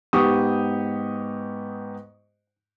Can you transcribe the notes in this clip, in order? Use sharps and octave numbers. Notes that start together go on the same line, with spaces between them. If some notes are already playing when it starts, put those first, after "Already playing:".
G#2 B3 G4 C#6 D#6